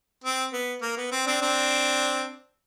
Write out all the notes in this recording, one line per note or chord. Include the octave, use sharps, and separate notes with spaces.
C4
B3
A#3
B3
C4
C4 D4
C4 D4